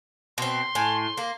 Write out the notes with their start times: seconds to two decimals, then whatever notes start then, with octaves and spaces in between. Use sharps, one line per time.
0.38 B2 C4 C6
0.75 A2 G#5
1.17 A#3